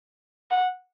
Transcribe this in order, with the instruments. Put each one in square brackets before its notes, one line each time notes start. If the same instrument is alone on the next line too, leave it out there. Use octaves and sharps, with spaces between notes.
[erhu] F#5